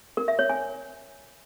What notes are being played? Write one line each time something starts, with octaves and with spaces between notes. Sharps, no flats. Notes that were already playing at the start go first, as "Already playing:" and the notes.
A#4
E5
C#5
G#5